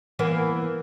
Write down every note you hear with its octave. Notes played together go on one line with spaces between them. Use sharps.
E3 A#3 B3